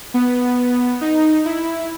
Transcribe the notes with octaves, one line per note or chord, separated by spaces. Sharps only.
B3
D#4
E4